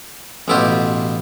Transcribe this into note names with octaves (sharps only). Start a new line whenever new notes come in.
A1 B2 E4 F4 G4